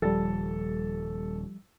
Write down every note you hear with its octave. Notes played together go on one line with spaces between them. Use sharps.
D#1 F3 G3 A4